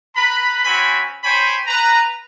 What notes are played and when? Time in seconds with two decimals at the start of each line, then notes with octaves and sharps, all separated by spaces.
0.16 B4 A#5 B5
0.64 C4 C#4 F#4 G#5 B5
1.24 C5 C#5 G5 G#5 B5
1.67 B4 A#5